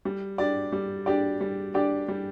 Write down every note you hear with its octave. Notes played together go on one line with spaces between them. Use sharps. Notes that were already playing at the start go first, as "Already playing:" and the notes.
G3
D4 G4 D5
G3
D4 G4 D5
G3
D4 G4 D5
G3